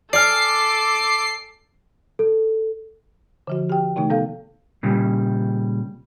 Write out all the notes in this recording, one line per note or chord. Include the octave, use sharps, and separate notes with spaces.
A4 D5 G#5 D6 F6 C7
A4
D3 F3 F#4
G4 G5
C3 D#3 A3 D#4
B3 A4 F5
A#2 C#3 G3